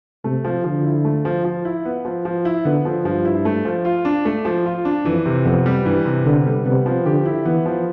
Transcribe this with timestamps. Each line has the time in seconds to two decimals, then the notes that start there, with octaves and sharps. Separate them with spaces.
0.24 C3 A3
0.44 F3
0.64 D3 F3
0.84 E4
1.05 A3
1.25 F3
1.44 F3
1.65 E4
1.85 B3
2.05 F3
2.25 F3
2.45 E4
2.65 D3 B3
2.85 F3
3.05 G2 F3
3.25 E4
3.45 A3
3.65 F3
3.85 F4
4.05 D4
4.25 A3
4.45 F3
4.65 F4
4.85 D4
5.05 F2 E3
5.26 C3
5.45 F2 B3
5.66 G3
5.86 G2 E3
6.05 C3
6.25 D3 B3
6.46 G3
6.65 C3 B3
6.86 F3
7.06 D3 G4
7.26 E4
7.45 E3 B3
7.66 F3